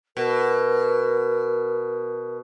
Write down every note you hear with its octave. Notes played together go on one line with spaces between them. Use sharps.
B2 A#4